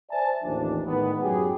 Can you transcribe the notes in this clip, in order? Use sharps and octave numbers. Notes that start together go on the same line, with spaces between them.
C5 D5 E5 G#5 A5
A1 D#2 F3 D4
A2 D#3 G#3 B3
F#2 F#3 G#3 G4 G#4